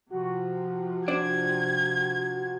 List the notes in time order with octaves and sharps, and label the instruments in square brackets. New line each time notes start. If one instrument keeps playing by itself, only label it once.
[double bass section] C3 F3 [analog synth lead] F#4
[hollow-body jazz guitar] D4 C5 D5 [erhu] G#6